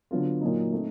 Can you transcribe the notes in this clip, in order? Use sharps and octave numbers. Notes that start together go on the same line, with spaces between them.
D3 F#3 B3 D4 F4
A#2 F#3 A#3 D#4
A3 C4 D#4